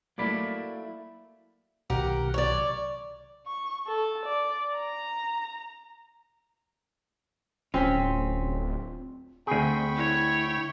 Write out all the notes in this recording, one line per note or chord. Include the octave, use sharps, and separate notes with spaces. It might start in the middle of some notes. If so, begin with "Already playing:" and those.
F#3 A3 A#3 E4 D5 B5
B1 C3 D#3 G4 A#4 F#5
C#5 D5
C#6
A4
D5
A#5
D1 C4 C#4 F4 C6 B6
D2 C4 G#4 G5 B5 C#6
E4 C#5